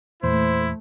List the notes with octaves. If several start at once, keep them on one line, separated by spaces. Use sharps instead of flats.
E2 A#2 A3 E4 C5